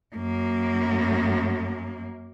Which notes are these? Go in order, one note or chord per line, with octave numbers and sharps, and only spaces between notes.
F#2 A#3